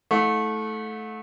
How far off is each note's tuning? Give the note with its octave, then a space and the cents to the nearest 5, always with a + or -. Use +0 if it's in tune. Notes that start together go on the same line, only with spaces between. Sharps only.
A3 -15 E4 -35 F#5 -45